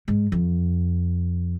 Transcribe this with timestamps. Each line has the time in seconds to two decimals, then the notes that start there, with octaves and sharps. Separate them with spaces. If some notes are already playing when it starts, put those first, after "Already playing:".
0.08 G#2
0.32 F2